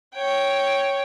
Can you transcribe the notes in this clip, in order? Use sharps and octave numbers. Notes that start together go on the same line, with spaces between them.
C#5 G5